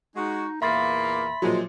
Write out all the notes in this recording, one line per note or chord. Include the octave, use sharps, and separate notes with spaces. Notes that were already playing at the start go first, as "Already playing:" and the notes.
G#3 D#4 F#4
E2 A#2 A#3 E5 B5 C6 A6
A#2 F3 F#3 G#3